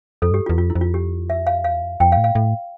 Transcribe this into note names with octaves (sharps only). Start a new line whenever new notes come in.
F2 A4
G2 G4
F4
E2
F2 F4
E4
F2
F4
G4
E5
F5
E2 F5
F2
F2 G5
F5
A2
F5
A2